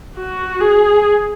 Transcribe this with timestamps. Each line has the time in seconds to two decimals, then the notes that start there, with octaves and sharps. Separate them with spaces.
0.17 F#4
0.60 G#4